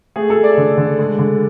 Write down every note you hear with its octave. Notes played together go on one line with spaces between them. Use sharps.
A3 G#4
A4
A3
D5
D3
D3
G#3
D3